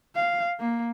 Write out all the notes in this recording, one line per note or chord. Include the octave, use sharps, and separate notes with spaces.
F5
A#3